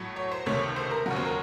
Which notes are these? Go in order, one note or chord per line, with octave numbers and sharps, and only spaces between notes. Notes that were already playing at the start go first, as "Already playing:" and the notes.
Already playing: A2 F#3 A3
C#5
C5
C#2 C3 D#3 A3 C#5
C5
A#4
D#2 C#3 F#3 F#4
C5
A#4